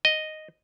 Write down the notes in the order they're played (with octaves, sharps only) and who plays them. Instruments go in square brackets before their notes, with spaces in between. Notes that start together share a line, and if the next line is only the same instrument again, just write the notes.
[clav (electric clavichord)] D#5